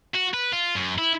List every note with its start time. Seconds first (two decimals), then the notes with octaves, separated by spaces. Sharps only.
0.14 F#4
0.34 B4
0.53 F4
0.75 F#2
0.98 E4